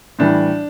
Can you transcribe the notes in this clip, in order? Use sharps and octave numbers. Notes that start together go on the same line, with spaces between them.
A2 E3 G3 D4